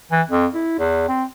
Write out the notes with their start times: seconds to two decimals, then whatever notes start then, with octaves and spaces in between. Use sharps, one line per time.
0.12 E3
0.29 F2
0.54 E4
0.79 E2
1.08 C4